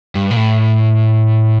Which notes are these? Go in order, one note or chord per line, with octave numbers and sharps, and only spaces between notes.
G2
A#2
A2